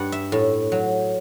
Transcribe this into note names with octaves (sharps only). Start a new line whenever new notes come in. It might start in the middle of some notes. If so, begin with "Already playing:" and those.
Already playing: G2 F#5
E5
A2
F#3